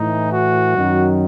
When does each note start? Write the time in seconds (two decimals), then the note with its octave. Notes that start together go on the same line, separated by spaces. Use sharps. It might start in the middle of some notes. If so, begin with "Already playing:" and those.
Already playing: A2 E3 D#4
0.31 F#4
0.75 F#2 D#3 F#3